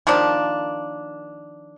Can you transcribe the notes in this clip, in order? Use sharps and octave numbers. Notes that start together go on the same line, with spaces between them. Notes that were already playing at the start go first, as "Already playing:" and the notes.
D#3 F3 A#3 D4